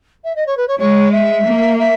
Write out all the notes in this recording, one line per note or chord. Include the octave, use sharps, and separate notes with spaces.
E5
D#5
C#5
B4
C#5
G#3 C#5
E5
A#3
E5